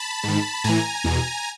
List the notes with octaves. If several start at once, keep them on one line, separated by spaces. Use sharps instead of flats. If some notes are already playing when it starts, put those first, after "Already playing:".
Already playing: A5 B5
G#2 D#3
A2 E3 G#5 A#5
E2 B2